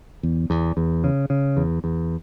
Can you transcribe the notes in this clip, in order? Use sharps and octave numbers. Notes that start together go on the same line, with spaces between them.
E2
E2
E2
C#3
C#3
E2
E2